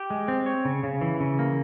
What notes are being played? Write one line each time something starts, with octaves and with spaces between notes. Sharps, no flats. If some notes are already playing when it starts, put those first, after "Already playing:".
Already playing: G4
G#3
C4
C#5
C#3
C#3
E3
C#3
A#3